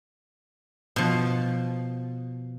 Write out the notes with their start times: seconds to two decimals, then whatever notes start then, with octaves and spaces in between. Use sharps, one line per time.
0.96 B2 F3